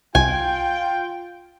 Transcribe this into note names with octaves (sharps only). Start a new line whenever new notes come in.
C2 F4 G5 G#5